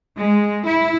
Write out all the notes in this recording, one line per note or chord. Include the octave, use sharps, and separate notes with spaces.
G#3
E4